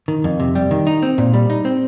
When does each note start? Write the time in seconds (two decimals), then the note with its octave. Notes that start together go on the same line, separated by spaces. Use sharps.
0.08 D#3
0.24 F2
0.40 C3
0.55 G3
0.71 D#3
0.87 D#4
1.03 C4
1.18 A#2
1.34 G3
1.50 D#4
1.65 C4